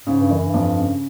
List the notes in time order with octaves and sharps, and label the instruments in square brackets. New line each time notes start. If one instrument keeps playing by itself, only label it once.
[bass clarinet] G#2 [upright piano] C#3
[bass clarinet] G2
[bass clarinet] F#2 [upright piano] E3
[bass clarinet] G2
[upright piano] F2
C#3